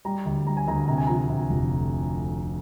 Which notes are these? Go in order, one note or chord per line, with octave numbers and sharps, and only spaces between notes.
G3 A#5
D2
G3 A#5
G#5
D2 A#5
C3 A#5
G#5
F3 A#5
C3
F1